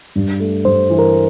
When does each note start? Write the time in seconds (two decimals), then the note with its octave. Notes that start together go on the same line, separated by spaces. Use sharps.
0.16 G2
0.40 A3
0.65 G2 C5
0.90 E3
0.99 A#4